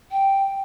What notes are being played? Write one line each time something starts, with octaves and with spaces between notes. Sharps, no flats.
G5